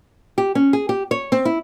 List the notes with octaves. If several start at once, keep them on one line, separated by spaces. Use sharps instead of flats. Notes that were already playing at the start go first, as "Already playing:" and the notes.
G4
C#4
G#4
G4
C#5
C4
E4